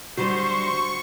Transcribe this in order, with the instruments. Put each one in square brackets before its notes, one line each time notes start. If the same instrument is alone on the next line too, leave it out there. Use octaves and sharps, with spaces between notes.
[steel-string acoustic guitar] D3 F#3 G3 [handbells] F#4 [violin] C5 C6 [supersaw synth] C#6